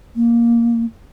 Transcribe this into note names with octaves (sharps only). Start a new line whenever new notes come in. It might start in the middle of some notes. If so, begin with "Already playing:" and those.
A#3